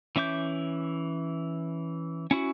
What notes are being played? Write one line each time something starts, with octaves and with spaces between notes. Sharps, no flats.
E3 C#4 E5 D6 G6
C#4 E4 F#4